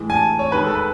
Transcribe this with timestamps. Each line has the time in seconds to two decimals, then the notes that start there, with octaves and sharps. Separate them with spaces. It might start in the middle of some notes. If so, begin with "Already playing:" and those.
Already playing: A2 E3 G#3
0.10 G#5
0.16 A5
0.39 C#5
0.51 D#2 D#3 G#3 B4
0.64 A4
0.75 B4